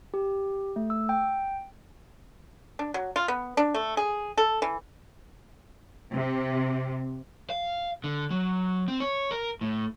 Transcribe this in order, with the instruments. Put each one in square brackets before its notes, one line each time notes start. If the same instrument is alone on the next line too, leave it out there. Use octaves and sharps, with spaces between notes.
[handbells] G4
A3
E6
G5
[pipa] D4
F#3
F4
B3
D4
A3
G#4
A4
E3
[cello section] C3
[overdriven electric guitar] F5
D3
F#3
C4
C#5
A#4
A2